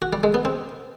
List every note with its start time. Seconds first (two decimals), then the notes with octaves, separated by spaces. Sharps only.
0.02 F#4
0.13 G3
0.23 G#3
0.34 B3
0.45 C4